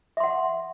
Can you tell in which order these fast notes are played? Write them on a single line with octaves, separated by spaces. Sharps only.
E5 C6 F#5